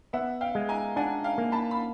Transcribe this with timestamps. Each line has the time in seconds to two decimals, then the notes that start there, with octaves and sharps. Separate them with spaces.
0.13 B3 E5 F#5
0.41 F5 G5
0.55 G#3
0.69 G#5 A#5
0.96 D4 F#5 G#5
1.24 F5 G5
1.38 A#3
1.52 A5 B5
1.71 B5